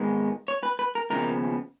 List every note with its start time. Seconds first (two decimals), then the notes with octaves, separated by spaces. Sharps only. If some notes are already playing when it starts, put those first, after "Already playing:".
Already playing: G#2 D#3 G#3 B3
0.48 C#5
0.63 B4
0.79 B4
0.95 A#4
1.10 D#2 C#3 F3 B3 A#4